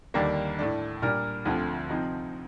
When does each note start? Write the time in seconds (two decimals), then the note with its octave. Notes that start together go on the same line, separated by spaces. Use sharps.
0.14 D#2 D3 G3 A#3 D4
0.59 A2 A3 D4
1.02 A#2 G3 D4 G4 A#4
1.45 D2 D3 F3 A3 C4
1.90 C3 F3 C4 D#4